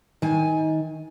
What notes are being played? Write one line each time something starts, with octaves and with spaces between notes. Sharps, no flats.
D#3 G#5